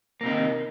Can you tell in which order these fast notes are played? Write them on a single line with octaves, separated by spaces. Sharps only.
A#3 C3 D#4 D#3